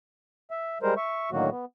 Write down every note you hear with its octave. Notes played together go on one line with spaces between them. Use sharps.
E5
G3 G#3 A#4 C5
E5 C#6
A2 D3 D#3 F#3 A#3 F#4
B3